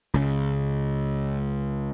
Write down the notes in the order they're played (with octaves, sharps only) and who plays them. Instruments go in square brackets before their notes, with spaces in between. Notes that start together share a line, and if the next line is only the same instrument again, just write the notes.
[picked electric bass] C#2 C#3